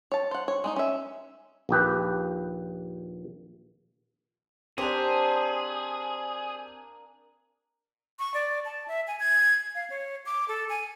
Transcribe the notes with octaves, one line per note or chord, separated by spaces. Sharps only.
C#5 A5
C5 F#5
C#5
G#3 D4 D#4
C#4 E5
A#1 D#2 G4 B4
A#3 C4 D4 G4 G#4 C5 F7
C#6
D5
A5
E5
G#5
G#6
F5
C#5
D6
A4
G#5